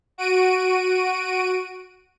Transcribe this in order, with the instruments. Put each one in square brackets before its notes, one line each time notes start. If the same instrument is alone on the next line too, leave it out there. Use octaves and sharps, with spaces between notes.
[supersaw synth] F#4 D7 D#7